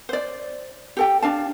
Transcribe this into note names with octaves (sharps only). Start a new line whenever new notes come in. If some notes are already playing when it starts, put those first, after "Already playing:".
C5 D5
G4 A4 G5
D4 F5 A5